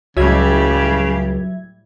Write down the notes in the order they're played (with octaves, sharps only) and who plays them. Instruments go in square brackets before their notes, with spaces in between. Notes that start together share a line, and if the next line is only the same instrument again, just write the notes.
[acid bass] C#2 [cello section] A2 G3 G4 [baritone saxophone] C#3 [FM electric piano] F#3 E5 G#6